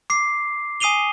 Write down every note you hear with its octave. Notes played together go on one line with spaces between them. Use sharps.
D6 C7
G#5 D#6 C7 D#7 F7 G7